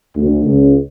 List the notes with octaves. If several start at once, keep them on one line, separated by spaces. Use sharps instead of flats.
D2
C#2